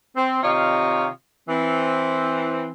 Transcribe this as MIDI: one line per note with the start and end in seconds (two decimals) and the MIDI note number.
0.17 0.41 60
0.43 1.08 48
0.43 1.08 51
0.43 1.08 65
0.43 1.08 73
0.43 1.08 75
0.43 1.08 77
1.49 2.70 52
1.49 2.70 60